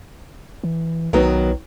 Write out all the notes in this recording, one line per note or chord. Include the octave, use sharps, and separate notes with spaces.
E3
B1 D#3 F#3 B3